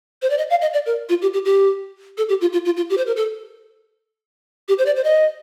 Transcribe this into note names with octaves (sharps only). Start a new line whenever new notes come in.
C5
D5
D#5
F5
D#5
D5
A#4
F4
G4
G4
G4
A4
G4
F4
F4
F4
F4
G4
C5
A#4
A4
G4
C5
D5
C5
D#5